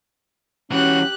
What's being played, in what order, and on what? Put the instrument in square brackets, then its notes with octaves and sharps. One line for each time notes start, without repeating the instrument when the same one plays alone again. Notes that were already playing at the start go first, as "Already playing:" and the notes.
[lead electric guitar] E3 F#4 [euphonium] C#4 [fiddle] G4 F#6